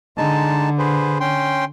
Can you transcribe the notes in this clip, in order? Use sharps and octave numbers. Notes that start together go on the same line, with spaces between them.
D3 G#3 D#4 A5
G#4 B4 C5
C#4 G5 C6